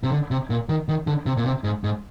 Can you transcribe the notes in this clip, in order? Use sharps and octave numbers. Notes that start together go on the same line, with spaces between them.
C3
D3
C3
A#2
D#3
D#3
D3
C3
A#2
C3
G#2
G#2